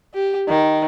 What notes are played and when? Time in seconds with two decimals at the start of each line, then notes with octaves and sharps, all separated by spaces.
0.14 G4
0.49 D#3